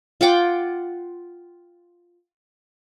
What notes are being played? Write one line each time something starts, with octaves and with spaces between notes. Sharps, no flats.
F4 F#5 G5 D6